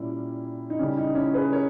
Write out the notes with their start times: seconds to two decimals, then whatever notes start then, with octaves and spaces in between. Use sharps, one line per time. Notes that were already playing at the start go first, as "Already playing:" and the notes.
Already playing: A#2 G3 C#4 E4
0.70 D#4
0.79 C#3 G3 C#4
0.97 D#4
1.15 C#4 E4
1.34 G#4 B4
1.52 A#4 C#5